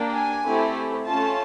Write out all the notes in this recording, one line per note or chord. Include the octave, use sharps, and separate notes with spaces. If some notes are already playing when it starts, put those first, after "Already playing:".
Already playing: A#3 D4 G4
G#5
A3 C4 E4 G4
A3 C#4 F4 A5